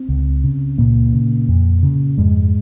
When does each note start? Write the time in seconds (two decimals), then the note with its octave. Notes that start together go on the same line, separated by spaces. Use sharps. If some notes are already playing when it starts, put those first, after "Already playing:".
Already playing: C4
0.09 C#2
0.44 C#3
0.78 C#2 A#2 A#3
1.13 C#3
1.49 F2
1.83 C#3
2.18 F2 G#2 G#3